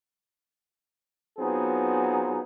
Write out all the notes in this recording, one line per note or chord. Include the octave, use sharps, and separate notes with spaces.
F#3 B3 C4 D#4 F4 G#4